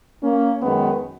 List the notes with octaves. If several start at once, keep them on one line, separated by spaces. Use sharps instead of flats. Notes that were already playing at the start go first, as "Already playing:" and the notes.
A#3 C#4
F#2 D#3 G#3 B3